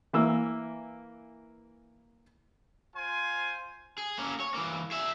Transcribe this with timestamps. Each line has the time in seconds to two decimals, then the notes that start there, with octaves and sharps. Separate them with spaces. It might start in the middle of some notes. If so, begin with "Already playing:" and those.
0.13 E3 A#3 E6
2.96 F4 C5 G#5
3.98 G#4
4.19 A#3 C#4
4.40 C#5
4.54 E3 A#3
4.91 G#4 E5